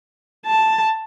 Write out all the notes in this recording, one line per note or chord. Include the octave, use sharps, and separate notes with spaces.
A5